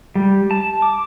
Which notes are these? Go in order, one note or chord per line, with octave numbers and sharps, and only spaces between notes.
G3
A5
D6